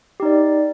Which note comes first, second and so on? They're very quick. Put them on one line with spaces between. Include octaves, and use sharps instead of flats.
G4 D#4 D5